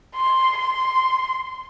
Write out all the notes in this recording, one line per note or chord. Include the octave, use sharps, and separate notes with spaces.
C6
C6